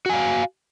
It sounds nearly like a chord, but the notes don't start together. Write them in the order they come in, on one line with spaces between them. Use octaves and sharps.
F#4 G#5 F5